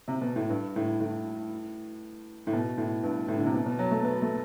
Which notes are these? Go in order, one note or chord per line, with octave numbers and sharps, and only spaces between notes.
C3
B2
A2
G2
A2
A2
A2
B2
A2
G2
A2
D3
C3
B2
B2
F#3
A3
B3
A3